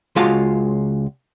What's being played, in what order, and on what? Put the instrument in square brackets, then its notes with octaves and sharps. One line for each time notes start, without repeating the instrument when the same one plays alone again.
[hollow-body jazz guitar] C#2 G#3 F4 F#4 F5 A5